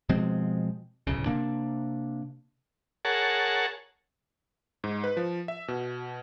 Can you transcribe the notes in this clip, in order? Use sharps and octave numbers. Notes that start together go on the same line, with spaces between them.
B2 F3 G#3 C4
D1 B1 C#3
C3 A#3 D4
G#4 A#4 C#5 F#5 A5
G#2
B4
F3
E5
B2